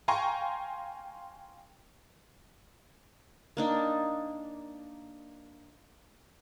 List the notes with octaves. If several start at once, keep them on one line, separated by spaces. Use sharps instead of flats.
F5 G5 G#5 A#5 C6 C#6
A#3 D4 D#4